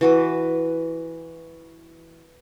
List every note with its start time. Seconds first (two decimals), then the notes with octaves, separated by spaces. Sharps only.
0.01 E3 F#4 B4